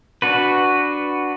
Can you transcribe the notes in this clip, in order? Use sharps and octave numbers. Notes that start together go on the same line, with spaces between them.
D4 F#4 B4